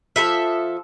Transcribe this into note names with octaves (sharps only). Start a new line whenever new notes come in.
F3 A4 E5